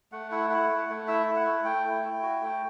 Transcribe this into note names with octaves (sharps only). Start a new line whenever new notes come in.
A3 F#5
E4 F#5
E4 F#5
A3
A3
E4 E5
E4
F#5
A3
A3 G5
E4
E4
F#4
A3